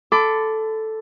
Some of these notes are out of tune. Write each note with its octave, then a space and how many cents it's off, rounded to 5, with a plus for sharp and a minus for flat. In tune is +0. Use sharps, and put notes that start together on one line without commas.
A4 +0 B5 +35 D6 +0